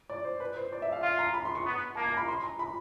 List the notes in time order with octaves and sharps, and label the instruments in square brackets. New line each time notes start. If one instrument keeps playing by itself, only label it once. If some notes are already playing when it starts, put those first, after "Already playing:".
[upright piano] D5
C5
B4
C5
D5
E5
F5
[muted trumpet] F4 [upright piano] F5
[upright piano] A#5
B5
C6
C#6
[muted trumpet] B3
[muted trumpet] A#3 [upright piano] A5
[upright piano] A#5
B5
C6
A#5
B5